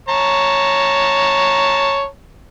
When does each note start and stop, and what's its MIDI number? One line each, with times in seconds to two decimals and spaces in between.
0.09 2.06 73
0.09 2.06 81
0.09 2.06 82